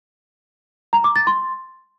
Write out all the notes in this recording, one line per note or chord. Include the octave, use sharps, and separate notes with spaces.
A#5
D6
A6
C6